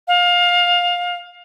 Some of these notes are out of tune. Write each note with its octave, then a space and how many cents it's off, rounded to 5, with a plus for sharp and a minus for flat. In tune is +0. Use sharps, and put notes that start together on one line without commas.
F5 +20